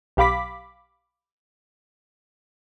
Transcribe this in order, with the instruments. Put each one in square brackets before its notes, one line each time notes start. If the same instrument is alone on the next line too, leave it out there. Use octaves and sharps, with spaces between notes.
[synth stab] B1 G4 F5 B5 D6 B6